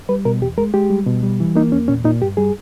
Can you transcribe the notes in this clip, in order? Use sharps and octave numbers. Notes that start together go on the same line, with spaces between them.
G3 B4
B2 A#4
E2 G4
G#3 A#4
G#3 G4
G3
B2
G3
E3
A#3 D#4
E2 C#4
A#2 C#4
A#2 D#4
G2 G4
G3 G#4